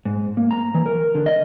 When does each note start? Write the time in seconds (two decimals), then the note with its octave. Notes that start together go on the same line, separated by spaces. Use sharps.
0.05 G#2
0.37 A#3
0.51 A#5
0.74 E3
0.86 A#4
1.15 D3
1.26 D#5